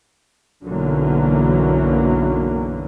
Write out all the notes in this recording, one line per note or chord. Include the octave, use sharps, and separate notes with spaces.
B1 F#2 D3 E3 F#3 A#3